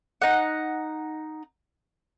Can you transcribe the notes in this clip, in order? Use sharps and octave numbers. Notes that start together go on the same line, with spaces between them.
D#4 F#5